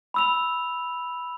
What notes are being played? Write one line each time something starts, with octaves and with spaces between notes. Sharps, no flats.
B5 E6 F7